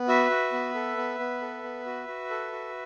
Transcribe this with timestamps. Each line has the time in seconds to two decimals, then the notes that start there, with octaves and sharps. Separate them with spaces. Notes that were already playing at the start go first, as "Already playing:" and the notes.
Already playing: B3
0.08 F#4 B4 E5
0.30 F#4
0.52 B3
0.75 A4
0.97 B3
1.19 B3
1.41 A4
1.64 B3
1.86 F#4
2.08 F#4
2.30 A4
2.52 F#4